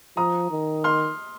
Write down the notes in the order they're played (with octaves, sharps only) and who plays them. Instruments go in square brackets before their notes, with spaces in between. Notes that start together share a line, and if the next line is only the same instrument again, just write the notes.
[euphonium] F3 [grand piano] A#5 D#6
[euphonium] D#3
[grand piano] C6 F6